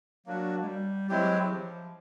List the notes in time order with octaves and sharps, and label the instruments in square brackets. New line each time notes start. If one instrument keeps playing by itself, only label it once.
[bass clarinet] F#3 [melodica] A#3 D4 F#4
[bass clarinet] G#3
G3
[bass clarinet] F#3 [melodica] G#3 C4 E4 G4
[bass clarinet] F3